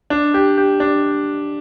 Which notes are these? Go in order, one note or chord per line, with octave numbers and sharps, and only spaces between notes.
D4
G4
G4
D4